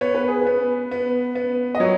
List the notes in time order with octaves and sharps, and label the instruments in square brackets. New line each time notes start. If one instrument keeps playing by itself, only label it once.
[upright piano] B3 [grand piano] C#5
[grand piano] B4
G#4
B4
[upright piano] B3
B3
B3
[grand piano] D#5
[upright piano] F#3 [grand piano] C#5